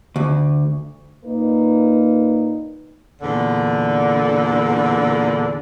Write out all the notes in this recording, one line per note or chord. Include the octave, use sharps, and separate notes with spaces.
D2
A#2 A#3 D#4 B4
E2 A#2 D3